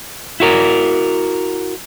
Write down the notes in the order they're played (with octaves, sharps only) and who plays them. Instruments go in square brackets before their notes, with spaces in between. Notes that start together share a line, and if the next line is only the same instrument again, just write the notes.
[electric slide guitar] E4 F#4 A#4